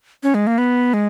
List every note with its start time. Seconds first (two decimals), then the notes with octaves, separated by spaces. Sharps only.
0.23 C#4
0.34 G#3
0.47 A#3
0.58 B3
0.94 G#3